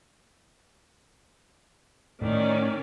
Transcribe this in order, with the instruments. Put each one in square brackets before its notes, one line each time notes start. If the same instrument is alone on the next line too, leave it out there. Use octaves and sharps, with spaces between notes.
[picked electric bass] A2 [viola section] D#3 C#4 D5